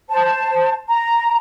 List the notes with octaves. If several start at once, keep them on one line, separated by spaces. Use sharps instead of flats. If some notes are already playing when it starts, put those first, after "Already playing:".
C5 A5
A#5